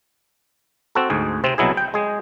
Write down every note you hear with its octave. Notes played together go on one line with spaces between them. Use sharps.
C4 F#4 A4
D2 G#2 G#4
C3 C4
C2 B2 F#3 E4 G#4
G5
G#3 G#4